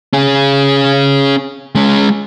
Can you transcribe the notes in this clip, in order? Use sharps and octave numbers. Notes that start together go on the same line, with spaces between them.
C#4 G#4
G#3 C#4